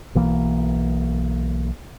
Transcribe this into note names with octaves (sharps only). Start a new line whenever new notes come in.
B1 E3 A#3